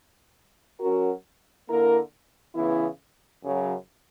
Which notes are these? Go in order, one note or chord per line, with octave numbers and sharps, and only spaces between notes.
F#3 C#4 F#4 A#4
D3 A#3 E4 A#4
C#3 E3 B3 E4
F#2 C#3 F#3